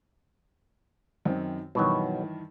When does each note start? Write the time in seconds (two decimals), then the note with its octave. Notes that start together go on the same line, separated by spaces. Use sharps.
1.25 F#2 D#3 C4
1.75 G2 B2 D#3 E3 F#3